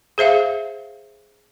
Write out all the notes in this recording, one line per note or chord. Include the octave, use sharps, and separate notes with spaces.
G#4 C5 E5 F5